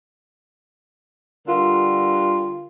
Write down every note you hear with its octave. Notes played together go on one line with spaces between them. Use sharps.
D3 G3 F4 A#4